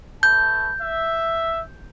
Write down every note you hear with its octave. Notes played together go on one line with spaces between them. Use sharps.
A3 B4 A5 G6
E5